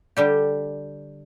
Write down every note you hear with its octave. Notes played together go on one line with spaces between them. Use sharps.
D3 G3 G4